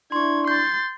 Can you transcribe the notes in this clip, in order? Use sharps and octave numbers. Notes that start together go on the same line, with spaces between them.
D4 E4 C6 C#6 G#6
C6 G6 A6